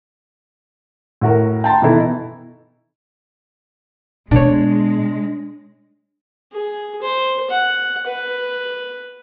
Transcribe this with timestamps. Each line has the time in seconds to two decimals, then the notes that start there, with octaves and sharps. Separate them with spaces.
1.21 A2 F#4 A#4
1.64 G5 A5 A#5 C6
1.82 B2 E3 D#4 E4 A4
4.31 B2 G#3 D4 C#5
6.53 G#4
7.02 C5
7.51 F#5
8.07 B4